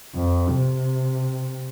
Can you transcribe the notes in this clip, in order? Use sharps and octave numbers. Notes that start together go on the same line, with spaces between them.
F2
C3